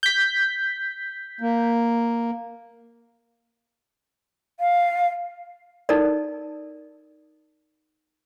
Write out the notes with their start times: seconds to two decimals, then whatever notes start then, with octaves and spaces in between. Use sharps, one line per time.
0.03 G6 B6
1.41 A#3
4.60 F5
5.89 D#4 A4 A#4 D5